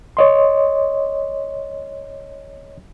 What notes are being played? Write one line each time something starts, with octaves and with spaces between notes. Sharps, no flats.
C#5 D#5 C6